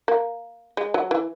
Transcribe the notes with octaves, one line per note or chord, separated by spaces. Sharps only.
A#3
G#3
F#3
E3